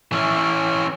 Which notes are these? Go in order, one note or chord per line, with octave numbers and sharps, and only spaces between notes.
E3 C#4